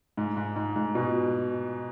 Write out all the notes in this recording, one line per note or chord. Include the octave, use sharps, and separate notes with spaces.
G#2
G#2
G#2
G#2
B2